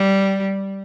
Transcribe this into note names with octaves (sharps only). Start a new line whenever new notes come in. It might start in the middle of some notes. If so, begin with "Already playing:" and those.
Already playing: G3